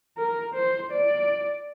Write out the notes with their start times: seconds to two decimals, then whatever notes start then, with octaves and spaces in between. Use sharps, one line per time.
0.17 A#4
0.54 C5
0.91 D5